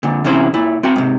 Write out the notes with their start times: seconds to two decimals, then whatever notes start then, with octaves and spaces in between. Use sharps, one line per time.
0.03 A#2 D3
0.24 E2 C3 E3 C#4 E4 C5
0.54 A#2 E4
0.83 C4 F#4 G5
0.96 G#2 C3